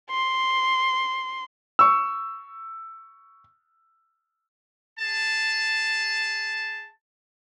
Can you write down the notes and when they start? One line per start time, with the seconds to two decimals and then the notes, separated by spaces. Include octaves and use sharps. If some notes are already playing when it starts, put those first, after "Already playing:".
0.10 C6
1.79 C#6 E6
5.00 G#4 A5